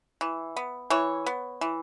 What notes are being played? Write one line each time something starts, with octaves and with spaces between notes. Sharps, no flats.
E3
B3
E3 C#5
B3
E3